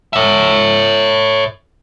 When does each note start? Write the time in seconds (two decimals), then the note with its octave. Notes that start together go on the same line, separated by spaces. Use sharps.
0.13 C#5 E5